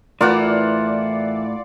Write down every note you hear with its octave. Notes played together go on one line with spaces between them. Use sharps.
A2 E3 E4 F4 A#4 D5 F#5